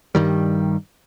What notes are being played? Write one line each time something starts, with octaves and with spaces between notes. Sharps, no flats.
G2 D#3 G3